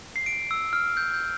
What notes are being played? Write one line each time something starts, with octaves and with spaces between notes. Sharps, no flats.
C7
D7
E6
F6
G6
G6